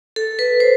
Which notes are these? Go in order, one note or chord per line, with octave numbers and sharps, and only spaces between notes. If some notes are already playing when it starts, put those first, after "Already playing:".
A4
B4
C5